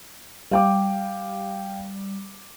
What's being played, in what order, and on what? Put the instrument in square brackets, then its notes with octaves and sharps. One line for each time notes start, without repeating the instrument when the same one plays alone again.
[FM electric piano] G3 [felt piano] F5 G5 D6